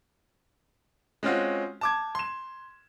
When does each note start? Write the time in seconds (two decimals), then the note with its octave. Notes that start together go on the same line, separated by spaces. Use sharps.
1.23 G#3 C4 C#4 F4 F#4
1.81 A5 D6 G#6
2.15 C6 E7